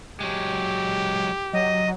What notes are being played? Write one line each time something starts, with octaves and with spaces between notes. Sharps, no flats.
F#3 G#3 G4
F#3 D#5